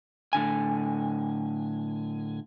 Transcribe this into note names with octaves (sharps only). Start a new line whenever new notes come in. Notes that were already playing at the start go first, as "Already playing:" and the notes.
A2 D3 G#5